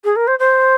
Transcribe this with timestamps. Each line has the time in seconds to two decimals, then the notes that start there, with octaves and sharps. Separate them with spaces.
0.04 G#4
0.16 A#4
0.27 C5
0.39 C5